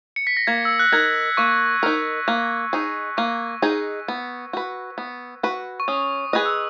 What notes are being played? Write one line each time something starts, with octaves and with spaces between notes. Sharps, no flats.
C#7
B6
A#6
A#3 G#6
E6
F#6
D#4 A#4 G#6
A#3 C#6
D#4 A#4
A#3
D#4 G#4
A#3 C#6
D#4 G#4
B3
F#4 B4
B3
F#4 B4
C#6
C#4 D#6
G#4 B4 D#5 F#6
E6